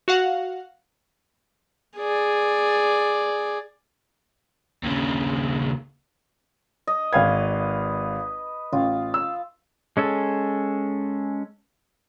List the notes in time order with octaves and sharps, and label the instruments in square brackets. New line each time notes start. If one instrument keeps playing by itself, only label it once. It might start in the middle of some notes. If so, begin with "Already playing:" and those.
[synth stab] F#4 F5 F#5
[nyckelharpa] G#4 D5
[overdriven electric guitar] D#2 C#3
[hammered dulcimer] D#5
[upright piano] G#1 F5 G#6 [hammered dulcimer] B4
[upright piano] A1 [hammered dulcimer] F4
[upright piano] E6
[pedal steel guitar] G#3 C#4 A4